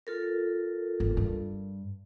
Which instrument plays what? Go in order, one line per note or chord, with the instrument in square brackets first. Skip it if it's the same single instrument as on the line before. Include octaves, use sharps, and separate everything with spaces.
[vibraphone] F4 A4 A#4
[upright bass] G1
G2